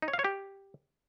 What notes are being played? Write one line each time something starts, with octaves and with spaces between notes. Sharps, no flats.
D#4
C#5
F5
C#5
G4